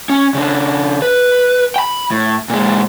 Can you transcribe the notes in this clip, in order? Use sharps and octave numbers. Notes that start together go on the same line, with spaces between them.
C#4
C#3 D4
B4
G5 B5
A2
A#2 G#3